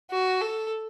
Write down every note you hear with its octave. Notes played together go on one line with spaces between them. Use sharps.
F#4
A4